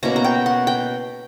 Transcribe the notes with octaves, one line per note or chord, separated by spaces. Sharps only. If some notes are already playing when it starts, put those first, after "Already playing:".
B2 A#3 C#4 A#5
A#5
G5
F#5
G5